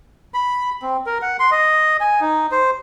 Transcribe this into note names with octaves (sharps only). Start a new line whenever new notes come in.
B5
C4
A#4
F#5
C6
D#5
G#5
D#4
C5